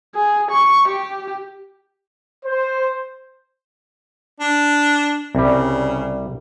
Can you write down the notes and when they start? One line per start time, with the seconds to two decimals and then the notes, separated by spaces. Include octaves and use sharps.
0.15 G#4
0.51 C#6
0.88 G4
2.46 C5
4.40 D4
5.35 C2 C#3 G3